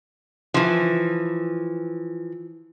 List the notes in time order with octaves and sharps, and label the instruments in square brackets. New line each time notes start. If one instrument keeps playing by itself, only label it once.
[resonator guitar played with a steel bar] E3 F3